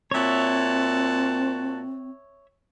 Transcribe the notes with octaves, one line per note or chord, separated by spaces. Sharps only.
A#2 C4 F#4 C#5 E5 A5